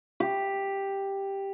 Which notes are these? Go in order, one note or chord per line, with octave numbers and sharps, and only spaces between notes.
G4